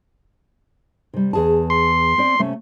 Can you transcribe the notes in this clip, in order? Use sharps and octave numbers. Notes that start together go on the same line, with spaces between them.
C3 G3
E2 G#4 A5
C6
C4 D5
C3 A3 C#4